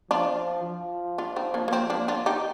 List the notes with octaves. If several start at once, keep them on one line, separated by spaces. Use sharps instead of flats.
F3 D4 F4
F3
D4 F4
C4 D#4
A#3 D4
A#3
C4
A#3 D4
D4 F4
D#4 G4